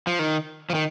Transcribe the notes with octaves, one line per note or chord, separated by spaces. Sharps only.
F3
D#3
F3
D#3